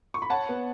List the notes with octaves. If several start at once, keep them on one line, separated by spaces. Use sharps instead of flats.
C#6
B5
C#5 F#5 A5
B3